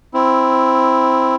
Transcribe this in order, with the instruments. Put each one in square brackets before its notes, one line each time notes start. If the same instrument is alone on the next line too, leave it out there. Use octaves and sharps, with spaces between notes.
[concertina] C4 E4